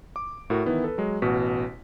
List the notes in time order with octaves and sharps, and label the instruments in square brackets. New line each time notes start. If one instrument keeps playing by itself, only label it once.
[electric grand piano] D6
A2 F#4 A#4
D#3 E3 B3 E4
A4 B4
F#3 G#3
A1 B2 F#4 B6